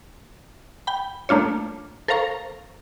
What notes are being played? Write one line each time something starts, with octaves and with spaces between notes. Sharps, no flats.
G5 B5
A3 A#3 D4 F4 C#5
A4 A#4 C5 F5 A#5 C#6